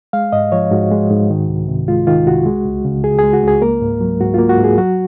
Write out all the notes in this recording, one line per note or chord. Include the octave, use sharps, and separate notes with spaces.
G#3 F5
G#2 D#5
F3 C#5
G#2 F#4
G#3
G#2
D#3
C2
C3
G#3 F4
D#3 F4
C2 F#4
G#3
C#2
C#3
C#2 G#4
G#3 G#4
F#4
C#2 G#4
A#3 A#4
G#2
F#3
G#2 F#4
A#3 F4
F#4
G#2
G#4
F#3 F#4